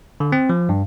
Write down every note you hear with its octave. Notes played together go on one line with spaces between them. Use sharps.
D3
C4
F3
G2